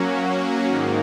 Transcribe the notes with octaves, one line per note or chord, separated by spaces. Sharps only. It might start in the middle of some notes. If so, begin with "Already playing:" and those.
Already playing: F#3 A#3 C#4 F#4
G#2 D#3 A#3